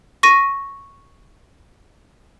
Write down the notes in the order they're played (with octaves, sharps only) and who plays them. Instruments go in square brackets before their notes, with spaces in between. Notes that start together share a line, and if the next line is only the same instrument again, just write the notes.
[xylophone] C#6 A#6 D#7